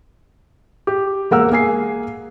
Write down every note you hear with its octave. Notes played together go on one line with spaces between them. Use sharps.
G4
E1 A#3 A#4 F#5 E6
A#3 G#4 G#5 C7